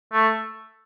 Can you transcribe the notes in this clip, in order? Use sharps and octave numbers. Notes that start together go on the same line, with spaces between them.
A3